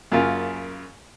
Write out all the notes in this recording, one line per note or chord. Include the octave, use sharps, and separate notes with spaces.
F#2 C#3 A#3 F4